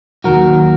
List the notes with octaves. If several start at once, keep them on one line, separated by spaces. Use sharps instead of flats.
D#2 D#3 F#3 F#4 A#4